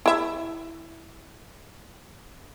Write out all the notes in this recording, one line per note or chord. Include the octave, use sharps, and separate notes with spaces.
E4 E5